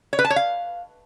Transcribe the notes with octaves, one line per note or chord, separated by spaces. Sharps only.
C#5
B4
A5
C#5
F5